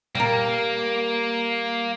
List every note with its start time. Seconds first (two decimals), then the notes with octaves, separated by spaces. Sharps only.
0.15 G3 A#3 A#4